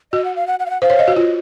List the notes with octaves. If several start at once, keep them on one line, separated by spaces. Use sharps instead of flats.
F#4 D#5
F#5
F5
F#5
F#5
F5
F#5
C5 F5
C#5
D#5
F#4
F4 D#5